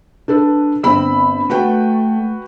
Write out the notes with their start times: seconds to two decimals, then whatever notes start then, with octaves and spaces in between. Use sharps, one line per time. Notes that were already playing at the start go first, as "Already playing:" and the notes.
0.28 D4 A4 B4
0.83 G1 C4 B5 E6
1.50 A3 F#4 B4 G5